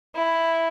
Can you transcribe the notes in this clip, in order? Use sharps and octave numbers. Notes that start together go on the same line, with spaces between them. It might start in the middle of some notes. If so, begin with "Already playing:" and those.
E4